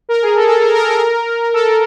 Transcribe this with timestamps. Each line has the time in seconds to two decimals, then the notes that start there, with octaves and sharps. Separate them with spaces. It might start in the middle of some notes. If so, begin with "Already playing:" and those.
0.09 A#4
0.22 G#4
0.36 A4
0.49 A4
0.61 A#4
0.75 A#4
0.88 A#4
1.53 A4